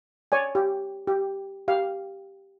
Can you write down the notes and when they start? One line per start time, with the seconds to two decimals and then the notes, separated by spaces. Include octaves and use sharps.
0.32 C#5 D5 G#5
0.55 G4
1.07 G4
1.68 G4 F5